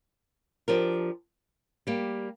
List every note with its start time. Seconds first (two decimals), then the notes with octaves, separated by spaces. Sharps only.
0.68 F3 D4 G4 A#4
1.87 G3 A#3 G4